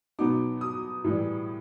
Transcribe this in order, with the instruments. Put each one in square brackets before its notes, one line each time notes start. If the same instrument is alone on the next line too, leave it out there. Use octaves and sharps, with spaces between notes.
[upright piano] B2 F#3 B3 D#4 D6
D#6
A2 E3 G3